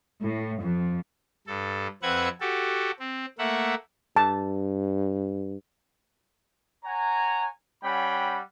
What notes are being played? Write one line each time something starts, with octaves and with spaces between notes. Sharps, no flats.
A2
F2
G2 A4
F2 C4 B4 E5 F#5 G#6
F#4 G4 A4
C4
A3 A#3 E5 F#5
G2 A5
C#5 F#5 G#5 A#5
G3 C#4 F#5 G5 B5